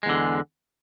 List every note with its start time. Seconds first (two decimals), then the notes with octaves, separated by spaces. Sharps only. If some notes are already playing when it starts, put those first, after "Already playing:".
0.03 G#3
0.06 E2
0.09 D3